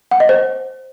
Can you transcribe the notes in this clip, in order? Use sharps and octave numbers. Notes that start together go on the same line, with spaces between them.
F#5
D#5
C5